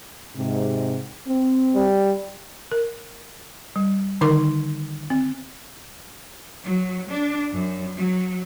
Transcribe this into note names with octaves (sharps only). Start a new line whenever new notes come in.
G#2 C3
C4
G3
A#4
G3
D3 D#3 D#4 A#4 C6 D6
C4
F#3
D4
F#2
F#3